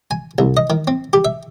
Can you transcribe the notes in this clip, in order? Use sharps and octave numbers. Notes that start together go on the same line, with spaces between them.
G#5
C2
D#5
D#3
C4
G4
E5